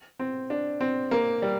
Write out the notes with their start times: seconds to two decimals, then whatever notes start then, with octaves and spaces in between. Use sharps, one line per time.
0.19 C4
0.50 D4
0.81 C4
1.11 A#3
1.42 G3